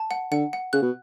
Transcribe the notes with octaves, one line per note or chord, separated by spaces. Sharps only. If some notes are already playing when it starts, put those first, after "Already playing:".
Already playing: A5
F#5
D3 F#5
F#5
C#3 F#6
B2